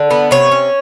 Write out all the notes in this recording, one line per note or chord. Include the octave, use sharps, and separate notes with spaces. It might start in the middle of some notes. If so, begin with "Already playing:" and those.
Already playing: D3
B3
C3 C#5
C#4